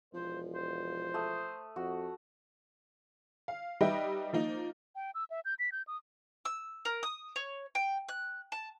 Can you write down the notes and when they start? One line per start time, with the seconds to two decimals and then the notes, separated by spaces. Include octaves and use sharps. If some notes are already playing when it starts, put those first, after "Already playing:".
0.14 E1 F3 C5
0.54 C5
1.14 A3 D#6
1.76 F2 F#4
3.48 F5
3.81 G3 D#4 B4 D#5 E5 G5
4.33 F3 A#3 D#4
4.95 G5
5.15 E6
5.30 E5
5.45 G6
5.59 B6
5.72 G6
5.87 D#6
6.45 E6
6.85 A#4
7.03 D#6
7.36 C#5
7.75 G5
8.09 F#6
8.52 A5